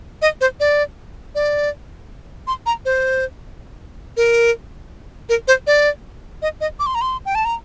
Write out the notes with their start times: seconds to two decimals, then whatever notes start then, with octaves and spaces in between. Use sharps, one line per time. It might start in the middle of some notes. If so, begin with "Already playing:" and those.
0.22 D#5
0.41 C5
0.60 D5
1.35 D5
2.47 C6
2.66 A#5
2.85 C5
4.17 A#4
5.29 A#4
5.48 C5
5.67 D5
6.42 D#5
6.61 D#5
6.79 D6
6.86 C6
6.95 A#5
7.01 C6
7.26 G5
7.35 A5
7.45 A#5